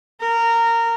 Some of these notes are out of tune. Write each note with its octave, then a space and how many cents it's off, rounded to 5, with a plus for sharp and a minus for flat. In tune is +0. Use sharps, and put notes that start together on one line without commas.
A#4 -15